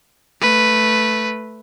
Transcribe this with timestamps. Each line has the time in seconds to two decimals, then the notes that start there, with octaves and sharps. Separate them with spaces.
0.41 A3 B4